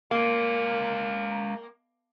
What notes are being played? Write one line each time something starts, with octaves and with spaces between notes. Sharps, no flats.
G#3 A#3 F5